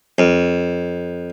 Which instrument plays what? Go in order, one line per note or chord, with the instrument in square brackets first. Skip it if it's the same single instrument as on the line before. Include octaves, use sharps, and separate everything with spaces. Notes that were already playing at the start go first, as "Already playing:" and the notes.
[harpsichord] F2